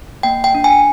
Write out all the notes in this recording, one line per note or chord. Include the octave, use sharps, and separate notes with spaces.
A#3 G5
G5
D4
G#5